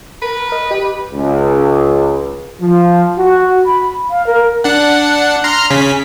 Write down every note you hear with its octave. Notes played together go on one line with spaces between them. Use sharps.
A#4 B4
D#5
G4
C#2
F3
F#4
B5
F5
A#4
D4 F#5
A#5 C6 F6
C#3 C#4 B6